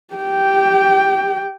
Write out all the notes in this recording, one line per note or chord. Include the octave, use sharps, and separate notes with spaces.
G4 G5